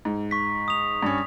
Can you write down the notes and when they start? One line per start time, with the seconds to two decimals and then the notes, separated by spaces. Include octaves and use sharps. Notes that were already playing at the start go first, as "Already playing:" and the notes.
0.05 G#2
0.31 C#6 B6
0.68 D#6 F7
1.03 G2 C#4